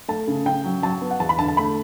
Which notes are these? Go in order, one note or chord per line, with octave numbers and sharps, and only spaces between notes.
A3 A5
C#3
C#3 G5
F#3
F#3 A5
B3
F#5
E2 A5
B5
D3 A5
A5
A3 B5